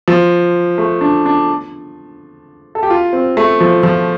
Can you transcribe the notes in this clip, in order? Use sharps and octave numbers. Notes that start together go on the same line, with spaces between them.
F3
A3
D4
D4
A4
G4
F4
C4
A3
F3
F3